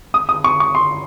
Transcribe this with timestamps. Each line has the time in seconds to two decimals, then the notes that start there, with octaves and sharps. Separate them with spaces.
0.14 D#6
0.29 D#6
0.44 C#6
0.60 C#6
0.75 C6